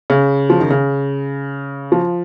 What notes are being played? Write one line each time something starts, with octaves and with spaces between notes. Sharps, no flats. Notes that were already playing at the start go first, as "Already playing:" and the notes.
C#3
F3
D#3
C#3
F3